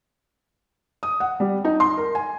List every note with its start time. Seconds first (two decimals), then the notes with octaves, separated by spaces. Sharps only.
1.03 D#6
1.20 F#5
1.40 G3
1.65 D#4
1.80 C6
1.97 A#4
2.15 G#5